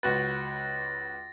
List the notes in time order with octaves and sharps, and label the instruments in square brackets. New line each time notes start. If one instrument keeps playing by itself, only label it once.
[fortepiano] C#2 F#4 B4 [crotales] A6 A#6